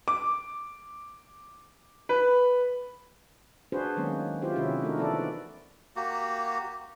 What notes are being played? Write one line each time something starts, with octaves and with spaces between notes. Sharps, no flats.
D6
B4
D4 F#4 G#4 B4 C5
D#3 F#3 G#3 A#3 B3 C#4
E4 F4 G4 C5
C3 D#3 C#4 E4 F#4 G#4
A3 D4 D#4 F#4 A#4
E3 F3 B3 E4 A4 D5
A#3 F#4 G4